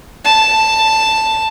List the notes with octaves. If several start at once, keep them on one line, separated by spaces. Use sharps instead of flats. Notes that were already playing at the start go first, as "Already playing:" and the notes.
A5